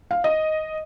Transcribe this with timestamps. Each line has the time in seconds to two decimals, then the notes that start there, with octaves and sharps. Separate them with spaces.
0.11 F5
0.24 D#5